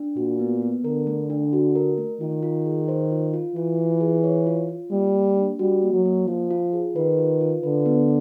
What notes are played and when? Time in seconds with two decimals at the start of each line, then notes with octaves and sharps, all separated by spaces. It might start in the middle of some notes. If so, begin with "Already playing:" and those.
Already playing: D4
0.16 A#2 F#4
0.39 B3
0.62 B3
0.84 D3 A#4
1.07 A3
1.30 D4
1.53 F#4
1.76 A#4
1.98 A3
2.21 D#3 F4
2.43 F4
2.65 G#4
2.88 C5
3.11 F4
3.34 F4
3.55 E3 F4
3.78 F4
4.01 G#4
4.24 C#5
4.47 F4
4.69 F4
4.91 G3 A#3
5.15 A#3
5.37 D4
5.59 G3 F#4
5.83 A#3
5.93 F#3
6.05 A#3
6.27 F3 F4
6.51 F4
6.73 G#4
6.96 D#3 B4
7.18 F4
7.41 F4
7.63 D3 B4
7.86 B3